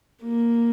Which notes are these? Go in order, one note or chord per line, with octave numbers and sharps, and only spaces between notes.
A#3